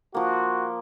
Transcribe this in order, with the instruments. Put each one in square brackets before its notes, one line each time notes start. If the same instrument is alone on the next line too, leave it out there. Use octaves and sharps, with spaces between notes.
[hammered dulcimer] F3 A#3 [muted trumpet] F#4